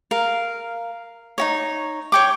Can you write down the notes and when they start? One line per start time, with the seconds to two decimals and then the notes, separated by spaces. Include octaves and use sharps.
0.11 A#4 F5
1.38 D#4 F#4 C#5
2.12 C#5 G5 D6